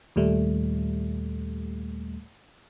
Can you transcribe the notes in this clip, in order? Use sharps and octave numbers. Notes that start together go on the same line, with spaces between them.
D#2 A#2 G3 A3